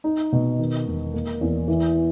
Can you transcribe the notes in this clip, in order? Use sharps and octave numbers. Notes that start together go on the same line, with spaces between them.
D#4
B2
D#3
E1
A#3
E2
E3